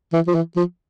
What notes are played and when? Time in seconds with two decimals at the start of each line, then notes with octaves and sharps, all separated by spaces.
0.13 E3
0.27 F3
0.35 E3
0.56 F3